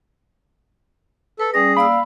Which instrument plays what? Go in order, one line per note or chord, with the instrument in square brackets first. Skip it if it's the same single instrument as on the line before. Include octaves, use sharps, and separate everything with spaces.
[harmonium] A4 [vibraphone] B4
[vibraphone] G3 C#4 D5 [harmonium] G#4 [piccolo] A#6
[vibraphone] A#3 D5 E6 [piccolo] F5 [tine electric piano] B5